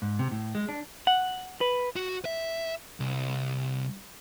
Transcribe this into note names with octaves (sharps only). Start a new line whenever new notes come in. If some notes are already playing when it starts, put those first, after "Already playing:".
G#2
C3
A2
G#3
D4
F#5
B4
F#4
E5
C2